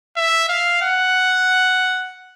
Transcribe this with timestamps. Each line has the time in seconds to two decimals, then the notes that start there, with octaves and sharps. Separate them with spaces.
0.17 E5
0.49 F5
0.82 F#5